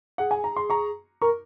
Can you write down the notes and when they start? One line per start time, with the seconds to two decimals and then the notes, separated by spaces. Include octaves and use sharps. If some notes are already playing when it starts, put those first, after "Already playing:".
0.18 G#4 F#5
0.31 G#5
0.44 A#5
0.56 C6
0.70 A#5 C#6
1.22 A#4 A#5 C#6